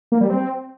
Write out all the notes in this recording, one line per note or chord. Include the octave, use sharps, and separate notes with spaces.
A#3
G3
C4